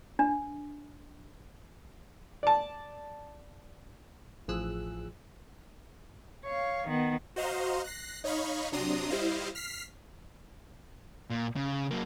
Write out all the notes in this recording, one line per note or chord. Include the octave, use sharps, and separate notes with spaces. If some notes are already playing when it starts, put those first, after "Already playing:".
D4
D5 A5
A1 A2 F3 G#4 E6 F#6
C#5 F5
D#3 B3
F#4 C5 D#5 F5 A#5 C6
F#6 A#6 C7
D#4 C#5 D#5 F5 B5 C#6
C3 F#3 D4 A#5 C6 D#6
G3 E4 C5 D#5 F5
F6 B6 C7
A#2
C#3
F#3 A#3